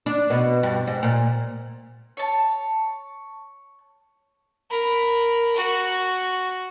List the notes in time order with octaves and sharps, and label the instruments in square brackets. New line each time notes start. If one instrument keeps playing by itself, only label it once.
[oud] D4
B2
G2
G#2
A#2
[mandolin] C#5 A5
[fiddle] A#4 B5
F#4